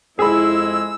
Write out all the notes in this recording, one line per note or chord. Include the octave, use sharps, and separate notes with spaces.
F2 G#3 E4 G#4 B5 E6